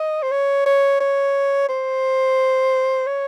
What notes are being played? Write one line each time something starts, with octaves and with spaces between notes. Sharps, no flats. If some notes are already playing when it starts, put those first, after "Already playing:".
Already playing: D#5
C5
C#5
C#5
C#5
C5
C#5